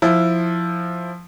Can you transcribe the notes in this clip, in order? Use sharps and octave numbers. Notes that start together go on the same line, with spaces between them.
F3 E4